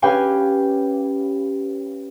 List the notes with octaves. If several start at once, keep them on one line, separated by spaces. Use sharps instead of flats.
C#4 G4 B4 F5 G5 G#5